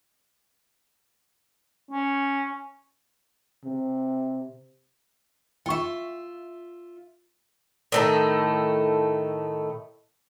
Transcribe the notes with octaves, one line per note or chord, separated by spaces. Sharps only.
C#4
C3
F4 E5 G5 C#6
A2 D#3 A3